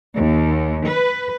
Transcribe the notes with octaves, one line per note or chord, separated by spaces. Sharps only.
D#2
B4